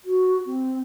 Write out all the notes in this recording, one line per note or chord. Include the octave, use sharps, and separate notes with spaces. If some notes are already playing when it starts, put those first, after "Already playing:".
F#4
C4